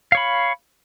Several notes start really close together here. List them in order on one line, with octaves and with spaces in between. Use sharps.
F5 C#5 B5